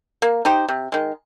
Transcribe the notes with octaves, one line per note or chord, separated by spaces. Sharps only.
A#3
D#4 G4 C5
C3
D#3 G#3